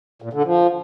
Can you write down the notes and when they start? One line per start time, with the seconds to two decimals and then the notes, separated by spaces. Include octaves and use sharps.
0.22 A#2
0.33 D3
0.44 F3